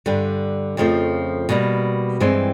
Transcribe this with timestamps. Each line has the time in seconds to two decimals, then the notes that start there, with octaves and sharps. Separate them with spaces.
0.06 G2 D3 G3
0.77 F2 C#3 F3 A3
1.49 B2 G3 A#3
2.20 G2 E3 G#3 C4